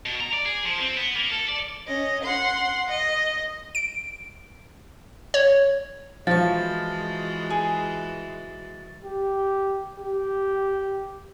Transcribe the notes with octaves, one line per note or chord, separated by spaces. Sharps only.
B2
A#5
D5
G#4
F3
C4
B3
A#3
A4
D5
C#4 D#5
F#5 C6
D#5
D7
C#5
E3 F3 G#3 F#4 F5 C#6 A6
G#4
G4
G4